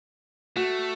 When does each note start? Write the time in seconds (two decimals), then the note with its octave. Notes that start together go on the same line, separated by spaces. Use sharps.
0.56 A3 F#4